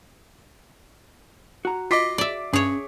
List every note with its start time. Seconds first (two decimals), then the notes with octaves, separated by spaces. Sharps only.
1.65 F#4 A#5
1.91 F4 D#5 D6 B6 C7
2.18 D5 E5
2.53 G2 C#4 G#4 C#5